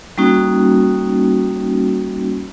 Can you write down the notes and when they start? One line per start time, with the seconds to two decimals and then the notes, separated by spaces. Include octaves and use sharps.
0.18 G3 A#3 C#4 D#4 F#4